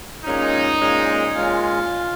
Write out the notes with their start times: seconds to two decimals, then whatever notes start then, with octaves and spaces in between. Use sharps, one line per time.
0.25 A#2 G#3 C#4 D#4
0.79 A#2 G#3 C#4
1.35 A#2 G#3 C#4 F4